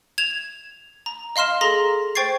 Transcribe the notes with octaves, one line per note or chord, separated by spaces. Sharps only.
G#6 E7 F7
A#5
D#5 F5 C6 F6 E7
G#4 A4 A#5 C6 A#6
C5 G5 C#6 G#6 A6 C7